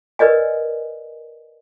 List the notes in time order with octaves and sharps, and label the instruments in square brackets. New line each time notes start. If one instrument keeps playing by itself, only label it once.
[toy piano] A#4 B4 D5 D#5 G#5